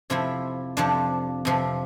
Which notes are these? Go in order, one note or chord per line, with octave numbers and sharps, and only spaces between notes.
F2 C3 F3 E4
F2 C3 F3 D4
F2 C3 F3